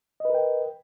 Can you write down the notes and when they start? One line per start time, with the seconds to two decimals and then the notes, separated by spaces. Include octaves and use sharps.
0.20 D#5
0.25 B4
0.30 A#4
0.35 G5